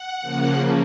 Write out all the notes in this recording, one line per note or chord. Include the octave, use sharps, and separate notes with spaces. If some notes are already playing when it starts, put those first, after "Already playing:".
Already playing: F#5
C#3 F3 A#3